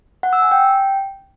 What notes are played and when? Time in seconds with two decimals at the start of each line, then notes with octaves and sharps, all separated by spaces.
0.23 F#5
0.33 E6
0.42 G#5
0.52 G5